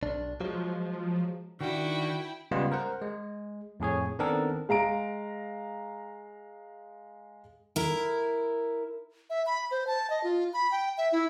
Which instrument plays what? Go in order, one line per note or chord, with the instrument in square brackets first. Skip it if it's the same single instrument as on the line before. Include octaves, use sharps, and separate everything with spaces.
[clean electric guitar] B1 D4
[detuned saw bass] F3 [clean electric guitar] F#3 G#3
[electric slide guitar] D#3 [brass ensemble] D4 F#4 [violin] E4 G5
[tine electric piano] C#3 G3 G#3 B3 F4
A#4 C5 F#5
G#3
F2 A2 G#4 C#5
D#3 B3 C4 D4 A4 A#4
[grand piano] G#3 F5 A#5 D7
[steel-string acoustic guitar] E4 A#4
[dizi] E5
B5
C5
A5
D#5
F4
B5
G5
E5
E4